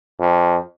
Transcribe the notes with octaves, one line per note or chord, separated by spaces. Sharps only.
F2